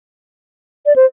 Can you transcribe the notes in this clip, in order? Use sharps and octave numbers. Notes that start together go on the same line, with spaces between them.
D5
C5